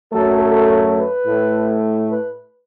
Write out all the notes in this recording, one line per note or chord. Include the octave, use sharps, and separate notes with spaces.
F#2 F#3 A3 A4
A4
B4
A2 A3
B4